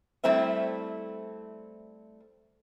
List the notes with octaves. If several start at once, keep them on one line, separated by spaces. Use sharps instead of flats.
G3 A3 C4 E4 C5 E5